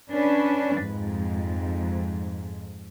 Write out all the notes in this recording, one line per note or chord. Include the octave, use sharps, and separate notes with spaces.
C#4 D4 B4
F2 G#2